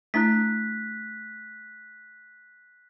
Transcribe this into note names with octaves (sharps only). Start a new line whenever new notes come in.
A3 D4 E4 F#6 B6